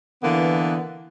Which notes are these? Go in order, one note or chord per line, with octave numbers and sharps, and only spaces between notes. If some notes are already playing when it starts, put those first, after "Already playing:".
D3 E3 A#3 B3